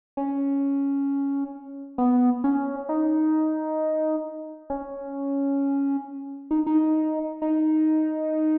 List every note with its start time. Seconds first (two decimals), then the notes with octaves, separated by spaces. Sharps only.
0.17 C#4
1.98 B3
2.44 C#4
2.89 D#4
4.70 C#4
6.51 D#4
6.67 D#4
7.42 D#4